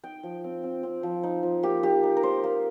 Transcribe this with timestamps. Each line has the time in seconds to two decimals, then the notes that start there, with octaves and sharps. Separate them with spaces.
0.04 D#4 G5
0.23 F3
0.44 C4
0.64 C4
0.83 C4
1.03 F3
1.23 D#4
1.43 F3
1.63 A#3 G4
1.83 D#4 G4
2.03 D#4
2.17 A#4
2.23 A#3 C5
2.44 A#3